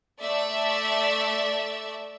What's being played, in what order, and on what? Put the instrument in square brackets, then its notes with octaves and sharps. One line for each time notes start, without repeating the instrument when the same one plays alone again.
[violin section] A3 D5 E5